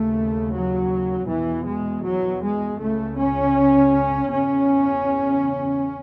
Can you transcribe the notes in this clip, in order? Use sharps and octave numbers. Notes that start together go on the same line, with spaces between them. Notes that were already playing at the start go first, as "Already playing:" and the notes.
Already playing: D#2 C#3 A3
F#3
E2 B2 E3
G#3
F#3
G#3
C#2 C#3 A3
C#4
E2 C#3 C#4